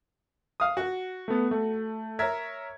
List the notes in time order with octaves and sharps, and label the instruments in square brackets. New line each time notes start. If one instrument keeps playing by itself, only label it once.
[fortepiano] F5 D#6
F#4
[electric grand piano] A3 B3
A3
[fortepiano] A#4 E5 [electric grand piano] C#5 G#6